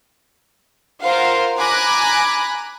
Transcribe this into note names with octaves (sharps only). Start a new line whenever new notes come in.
F4 A#4 C5 F5 F#5
G#5 A#5 B5 D6 F#6 A#6